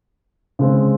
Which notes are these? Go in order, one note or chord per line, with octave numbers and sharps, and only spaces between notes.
C#3 G#3 C4